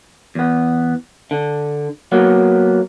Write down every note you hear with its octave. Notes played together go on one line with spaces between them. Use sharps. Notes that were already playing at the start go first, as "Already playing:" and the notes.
E2 B3
D3
F#3 A#3 B3